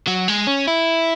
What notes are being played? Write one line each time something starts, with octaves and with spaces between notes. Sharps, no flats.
F#3
G#3
C#4
E4